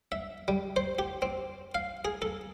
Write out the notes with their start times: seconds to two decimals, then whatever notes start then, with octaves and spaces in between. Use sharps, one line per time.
0.12 E5
0.48 G3
0.76 C5
0.99 G4
1.22 C4
1.75 F5
2.05 G#4
2.22 A4